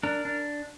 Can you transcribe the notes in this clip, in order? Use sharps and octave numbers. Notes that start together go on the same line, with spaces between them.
D4 A#4
D4